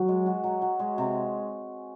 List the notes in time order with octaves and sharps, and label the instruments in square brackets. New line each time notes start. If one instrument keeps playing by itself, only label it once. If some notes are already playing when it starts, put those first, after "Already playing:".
Already playing: [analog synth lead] F#3 [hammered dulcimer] F#4
[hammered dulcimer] G#3
F#4
F#3
F#3
G#3
C3